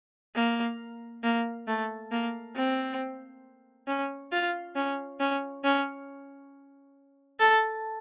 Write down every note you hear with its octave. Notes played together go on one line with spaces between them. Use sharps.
A#3
A#3
A3
A#3
C4
C#4
F4
C#4
C#4
C#4
A4